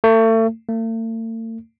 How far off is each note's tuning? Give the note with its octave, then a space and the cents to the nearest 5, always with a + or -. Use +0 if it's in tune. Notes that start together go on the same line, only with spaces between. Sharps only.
A3 +35
A3 +45